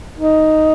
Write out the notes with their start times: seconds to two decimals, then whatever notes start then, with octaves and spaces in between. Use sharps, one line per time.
0.18 D#4